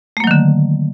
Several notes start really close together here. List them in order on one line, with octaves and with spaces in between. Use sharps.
A3 A#3 F#3 D#3 D3